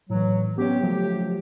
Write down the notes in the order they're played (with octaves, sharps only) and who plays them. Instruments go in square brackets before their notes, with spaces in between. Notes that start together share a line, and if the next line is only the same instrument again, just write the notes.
[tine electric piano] A2 E3 [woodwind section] F#3
[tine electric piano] B3 C#4 C#5 [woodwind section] G4
[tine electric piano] F3 F#3 A3